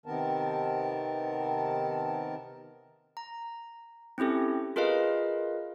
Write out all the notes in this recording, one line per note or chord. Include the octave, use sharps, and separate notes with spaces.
C3 D#3 B3 C4 A#4 A5
A#5
C4 C#4 E4 G4 A4
F4 G#4 A#4 B4 D#5 F5